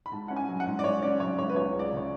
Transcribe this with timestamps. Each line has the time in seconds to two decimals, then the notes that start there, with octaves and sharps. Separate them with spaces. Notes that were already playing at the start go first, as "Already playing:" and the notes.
0.06 B5
0.12 G#2 A5
0.28 C#4 F#5
0.36 G#5
0.49 F#3
0.60 F#5
0.66 G#2
0.79 D5
0.84 G#2 C#5
1.02 C#4 D5
1.20 F#3 C#5
1.38 G#2 C#5
1.49 B4
1.56 C#2 C#5
1.74 G#3
1.79 D5
1.93 C#3 C#5